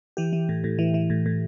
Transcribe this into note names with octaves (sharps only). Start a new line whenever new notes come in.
E3 G4
E3
A2
A2
E3
E3
A2
A2